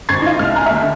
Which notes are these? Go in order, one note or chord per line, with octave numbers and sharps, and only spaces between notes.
G#1 C5 C#6 G#6 A6 C7
D#4 F4
C2 F6
G#5 A#5 F#6
D#2 E5
D3